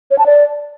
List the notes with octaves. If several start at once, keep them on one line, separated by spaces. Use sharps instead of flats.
C#5
A5
D5